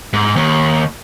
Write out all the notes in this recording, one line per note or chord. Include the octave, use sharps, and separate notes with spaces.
G#2
D#2